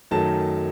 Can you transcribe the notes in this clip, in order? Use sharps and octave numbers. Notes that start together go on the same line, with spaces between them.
F#2 D#3 F#3 A3 A5